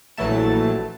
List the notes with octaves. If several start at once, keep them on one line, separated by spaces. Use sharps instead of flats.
A#1 E3 F#3 A3 A5